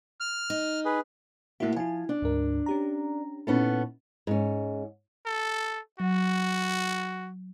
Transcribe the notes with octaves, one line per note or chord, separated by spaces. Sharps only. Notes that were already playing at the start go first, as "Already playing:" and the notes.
F6
D#4
G#4 B4
A2 A#3 E4 F#4 E5
F3 E4 G#5
D4
D2 G#2 A#4
C#4 G4 A#5
A#2 B3 C#4 D#4 E4 A4
G#2 C#4
A4
F#3 F#4